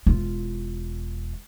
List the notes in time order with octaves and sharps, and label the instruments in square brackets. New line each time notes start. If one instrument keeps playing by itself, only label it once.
[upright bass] E1 F4